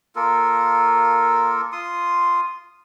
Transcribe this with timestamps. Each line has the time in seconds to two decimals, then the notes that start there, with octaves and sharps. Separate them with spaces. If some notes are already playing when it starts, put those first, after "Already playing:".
0.16 A#3 F4 A4 A#4
1.72 F4 C6 D#6